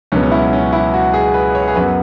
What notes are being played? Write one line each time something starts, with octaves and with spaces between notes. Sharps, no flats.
C#2 B2 F#3 B3 C#4
C#4
E4
C#4
E4
F#4
G#4
B4
C#5
G#4
F#2 F#3 B3 B4